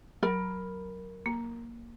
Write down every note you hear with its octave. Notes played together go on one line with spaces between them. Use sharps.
F#3 A#4 B5
A#3